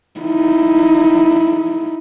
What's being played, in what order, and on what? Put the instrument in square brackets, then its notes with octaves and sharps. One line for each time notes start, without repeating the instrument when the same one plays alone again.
[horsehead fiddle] D#4 E4